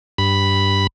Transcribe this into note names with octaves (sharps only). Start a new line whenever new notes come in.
G2 B5